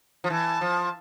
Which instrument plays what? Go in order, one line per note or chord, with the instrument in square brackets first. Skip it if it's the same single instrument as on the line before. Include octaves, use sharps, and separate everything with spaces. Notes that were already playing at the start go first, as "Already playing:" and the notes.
[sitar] F3
[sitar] E3 [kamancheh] A5
[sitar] F3